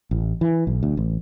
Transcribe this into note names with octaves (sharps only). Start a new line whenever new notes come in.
A1
E3
B1
D2
A1